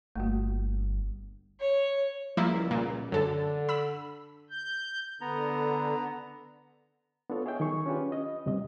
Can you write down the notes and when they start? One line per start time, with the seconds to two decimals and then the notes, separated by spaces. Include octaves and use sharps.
0.15 G1 A3 A#3 F#4
1.60 C#5
2.37 C#2 F3 G3 A#3 E4
2.71 A#2
3.12 F#2 D3 A4
3.69 B5 E6
4.50 G6
5.21 D3 B3 A#5
7.30 B3 D4 F4 A4 C#5
7.46 G#4 C#5 D#5 E5 G5 G#5
7.60 D#3 F#3 G#4 C#6
7.86 C#4 D4 F4 G4 B4
8.12 D#5
8.46 D2 C3 G3 D#5